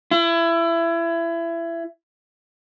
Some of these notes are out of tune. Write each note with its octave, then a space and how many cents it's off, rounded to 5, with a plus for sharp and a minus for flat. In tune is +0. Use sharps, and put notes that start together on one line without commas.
E4 +25